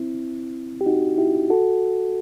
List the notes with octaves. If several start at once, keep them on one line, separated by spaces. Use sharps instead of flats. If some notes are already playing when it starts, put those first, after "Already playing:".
Already playing: C4 E4
G4
D#4 F#4
E4 G4
F#4 A4